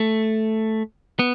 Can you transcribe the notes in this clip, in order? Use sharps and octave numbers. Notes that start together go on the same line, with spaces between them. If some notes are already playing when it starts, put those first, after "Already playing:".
Already playing: A3
B3